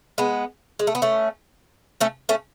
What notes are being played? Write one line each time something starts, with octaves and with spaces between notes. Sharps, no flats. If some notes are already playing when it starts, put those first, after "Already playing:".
G#3 B3
G#3
A3
B3
A3 C#4
A3 C#4
A3 C#4